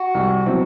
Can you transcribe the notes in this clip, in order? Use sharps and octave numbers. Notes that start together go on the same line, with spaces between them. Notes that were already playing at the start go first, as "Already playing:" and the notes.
Already playing: F#4
C2
B2 F#3 C4 E4